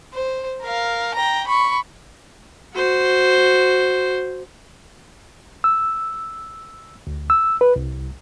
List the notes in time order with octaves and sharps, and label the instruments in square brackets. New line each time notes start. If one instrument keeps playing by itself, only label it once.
[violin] C5
A#4 F5
G5 A#5
B5 C#6
[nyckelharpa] F#4 C5
[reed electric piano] E6
D2
E6
B4
C2